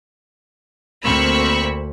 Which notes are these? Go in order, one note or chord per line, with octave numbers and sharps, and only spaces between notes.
D2 A#3 C4 B5 C#6 E6